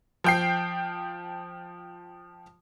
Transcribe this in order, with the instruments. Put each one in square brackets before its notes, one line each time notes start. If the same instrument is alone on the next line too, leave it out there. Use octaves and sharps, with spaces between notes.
[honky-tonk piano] F3 G5 C7